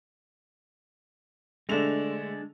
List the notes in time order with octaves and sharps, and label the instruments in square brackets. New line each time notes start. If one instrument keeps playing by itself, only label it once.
[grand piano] D3 A3 F7 [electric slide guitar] G#3 D4